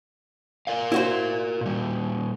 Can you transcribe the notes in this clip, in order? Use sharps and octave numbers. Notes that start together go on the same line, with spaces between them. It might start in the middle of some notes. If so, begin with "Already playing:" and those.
A#4 D5 F5
E4 F#4 C5
A#2 G3